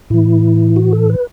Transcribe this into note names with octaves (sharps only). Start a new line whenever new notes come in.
A2 E3 E4
F#4
A4
B4